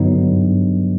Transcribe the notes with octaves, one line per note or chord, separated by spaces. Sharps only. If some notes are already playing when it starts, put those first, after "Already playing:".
Already playing: G2 D3 F#3 B3 D#4
G2